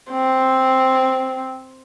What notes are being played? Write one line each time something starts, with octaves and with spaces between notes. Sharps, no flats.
C4